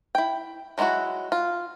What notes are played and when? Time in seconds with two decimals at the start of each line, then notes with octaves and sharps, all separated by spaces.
0.15 E4 G5
0.78 F#3 G#3 D4 E4 F#4
1.32 F4